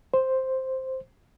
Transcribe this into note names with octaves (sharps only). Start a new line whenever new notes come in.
C5